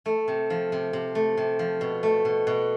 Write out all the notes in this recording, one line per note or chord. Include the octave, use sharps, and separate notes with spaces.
A3
C3
F3
C3
C3
A3
C3
F3
B2
A3
B2
B2